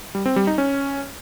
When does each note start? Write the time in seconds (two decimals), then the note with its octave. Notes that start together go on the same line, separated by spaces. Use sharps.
0.15 G3
0.26 C4
0.36 G3
0.47 D#4
0.58 C#4